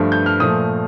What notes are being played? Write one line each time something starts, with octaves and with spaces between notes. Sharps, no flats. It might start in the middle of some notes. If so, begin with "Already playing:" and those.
Already playing: G2 F3 A3
G6
F6
A#2 F3 A3 D#6